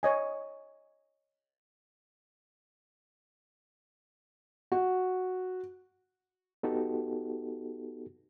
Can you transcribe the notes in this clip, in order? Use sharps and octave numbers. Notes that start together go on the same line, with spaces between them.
C#5 D#5 G#5
F#4
B3 D#4 F#4 G4 A4